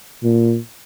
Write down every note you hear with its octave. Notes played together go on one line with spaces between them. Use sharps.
A#2